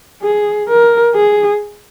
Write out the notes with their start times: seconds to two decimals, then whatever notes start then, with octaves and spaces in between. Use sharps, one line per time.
0.22 G#4
0.68 A#4
1.15 G#4